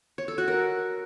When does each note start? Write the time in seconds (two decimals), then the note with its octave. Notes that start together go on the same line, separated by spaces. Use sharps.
0.18 C#5
0.28 A4
0.38 F#4
0.48 A#4